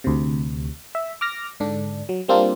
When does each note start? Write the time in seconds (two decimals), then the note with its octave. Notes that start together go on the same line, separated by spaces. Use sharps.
0.04 D2 C3
0.95 E5
1.21 D6 F6 A#6
1.60 G#2 D3 D4
2.09 F#3
2.28 G3 A#3 C4 D4 F4